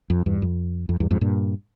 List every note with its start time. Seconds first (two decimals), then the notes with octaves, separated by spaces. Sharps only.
0.10 F2
0.26 E2 G2
0.42 F2
0.89 F2
1.00 E2 G2
1.11 F2 G#2
1.21 G2 A#2